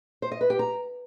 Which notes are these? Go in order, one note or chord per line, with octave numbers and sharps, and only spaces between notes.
C5
D#5
B4
G4
A#5